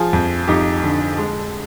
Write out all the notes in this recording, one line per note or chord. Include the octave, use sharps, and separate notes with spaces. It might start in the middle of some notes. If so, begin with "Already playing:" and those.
Already playing: F3 F4 G#4
F2
F2 D#4 G4
D3
G#3